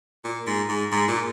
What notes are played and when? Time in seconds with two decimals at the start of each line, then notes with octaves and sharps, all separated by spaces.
0.24 A#2
0.47 G#2
0.69 G#2
0.92 G#2
1.08 A#2